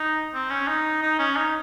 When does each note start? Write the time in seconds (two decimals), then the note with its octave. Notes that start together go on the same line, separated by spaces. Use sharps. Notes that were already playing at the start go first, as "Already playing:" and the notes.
Already playing: D#4
0.34 C4
0.50 C#4
0.68 D#4
1.02 D#4
1.19 C#4
1.37 D#4